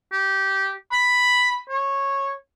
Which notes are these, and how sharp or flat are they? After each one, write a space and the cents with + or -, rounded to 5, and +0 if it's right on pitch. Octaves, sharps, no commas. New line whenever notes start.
G4 -15
B5 +0
C#5 -15